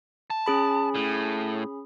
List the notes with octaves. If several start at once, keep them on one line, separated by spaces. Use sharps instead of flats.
A5
C#4 G#4 B5
A2